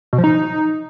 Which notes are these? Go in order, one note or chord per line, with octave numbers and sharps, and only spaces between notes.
B2
F3
D#4